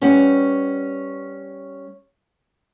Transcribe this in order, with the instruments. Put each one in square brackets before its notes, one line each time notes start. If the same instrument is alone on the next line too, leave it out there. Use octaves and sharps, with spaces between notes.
[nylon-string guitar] G3 C#4 B4 F#5